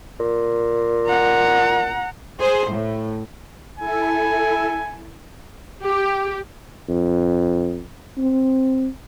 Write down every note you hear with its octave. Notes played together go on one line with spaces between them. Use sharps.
A#2
F#5 A#5
G#4 C5
A2
E4 A4 G#5
G4
F2
C4